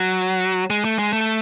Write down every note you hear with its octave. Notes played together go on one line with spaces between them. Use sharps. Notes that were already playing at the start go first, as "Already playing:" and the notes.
Already playing: F#3
G#3
A3
G#3
A3